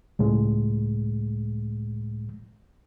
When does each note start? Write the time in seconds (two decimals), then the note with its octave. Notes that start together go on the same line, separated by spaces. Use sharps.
0.19 C#2 A2 G#3